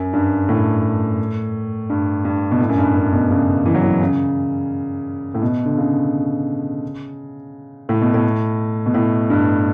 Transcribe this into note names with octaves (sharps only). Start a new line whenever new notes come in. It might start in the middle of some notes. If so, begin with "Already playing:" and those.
Already playing: F#2
G2
A2
G2
G2
B2
A2
F#2
G2
F#2
B2
C#3
E3
F#3
E3
C#3
A2
B2
D3
C#3
A2
B2
A2
B2
A2
G2